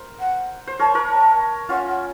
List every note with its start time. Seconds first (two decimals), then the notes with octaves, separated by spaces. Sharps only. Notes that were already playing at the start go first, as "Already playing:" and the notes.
Already playing: A#4 C5
0.19 F#5
0.67 C5
0.79 A#4 C#5 A5
0.95 A#4 C#5 A#5
1.10 A5
1.69 C#4 F4 F#5
1.89 F#5